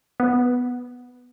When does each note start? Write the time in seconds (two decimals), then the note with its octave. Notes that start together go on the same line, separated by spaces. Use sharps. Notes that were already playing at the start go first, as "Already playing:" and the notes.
0.20 B3